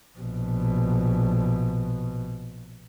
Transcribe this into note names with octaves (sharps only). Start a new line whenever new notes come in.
A#1 B2